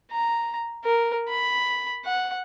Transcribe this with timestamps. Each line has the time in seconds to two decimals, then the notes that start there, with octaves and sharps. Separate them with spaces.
0.12 A#5
0.85 A#4
1.29 B5
2.05 F#5